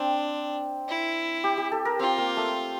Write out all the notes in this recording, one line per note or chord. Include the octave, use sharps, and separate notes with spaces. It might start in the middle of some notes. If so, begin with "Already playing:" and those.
Already playing: C4 D4
E4
G4
G4
A4
A#4
C4 F4
A#3
A3